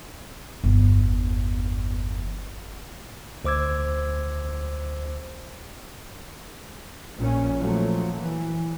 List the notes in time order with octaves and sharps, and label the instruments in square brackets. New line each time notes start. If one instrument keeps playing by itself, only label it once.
[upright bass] G1 E2
[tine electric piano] D2 C5 D6 E6 G#6
[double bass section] A#1 A#2 C#4
F3 F#3 A3 A#3
E3